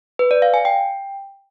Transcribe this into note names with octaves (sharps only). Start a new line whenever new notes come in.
B4
D5
F5
G#5
G5